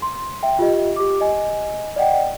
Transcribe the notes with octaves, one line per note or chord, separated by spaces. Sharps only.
C6
E5 G5
F4 G4 D#5
G4 D6
D#5 G#5
D5 D#5 F#5 G5